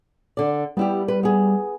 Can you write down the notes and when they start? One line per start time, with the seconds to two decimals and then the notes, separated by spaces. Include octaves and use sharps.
0.37 D3 D5
0.77 G3 B3 E4 G4
1.08 B4
1.23 B3 G#4